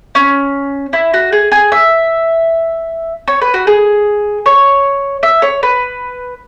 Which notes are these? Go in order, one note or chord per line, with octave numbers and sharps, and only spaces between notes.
C#4
E4
F#4
G#4
G#4
E5
C#5
B4
F#4
G#4
C#5
E5
C#5
B4